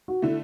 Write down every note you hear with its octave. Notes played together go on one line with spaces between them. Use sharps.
F#4
D3 A3 E4